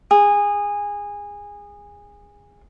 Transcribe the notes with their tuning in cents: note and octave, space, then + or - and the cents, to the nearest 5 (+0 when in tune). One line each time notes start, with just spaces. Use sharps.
G#4 -20